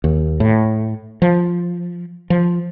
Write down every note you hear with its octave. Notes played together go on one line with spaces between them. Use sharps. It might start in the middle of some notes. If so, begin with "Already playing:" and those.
D#2
A2
F3
F3